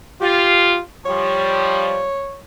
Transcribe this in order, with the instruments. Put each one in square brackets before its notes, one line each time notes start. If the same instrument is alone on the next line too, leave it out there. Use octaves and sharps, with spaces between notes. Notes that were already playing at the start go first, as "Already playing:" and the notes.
[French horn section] F4 [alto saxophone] G4
[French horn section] F3 G3 [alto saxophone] C#5